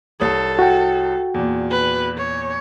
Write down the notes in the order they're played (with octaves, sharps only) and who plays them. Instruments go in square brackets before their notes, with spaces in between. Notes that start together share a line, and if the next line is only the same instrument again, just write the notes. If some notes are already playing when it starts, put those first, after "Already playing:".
[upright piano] C2 C#5 D#6 [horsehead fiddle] A4
[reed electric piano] F#4 G5
[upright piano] E2 A#2
[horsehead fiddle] B4
C#5